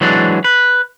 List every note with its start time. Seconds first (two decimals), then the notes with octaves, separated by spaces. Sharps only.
0.01 E3 F#3 G#3 D4
0.44 B4